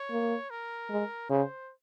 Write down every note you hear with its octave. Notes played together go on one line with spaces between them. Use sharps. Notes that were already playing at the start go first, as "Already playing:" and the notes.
Already playing: C#5
A#3
A#4
G#3
C#3 C5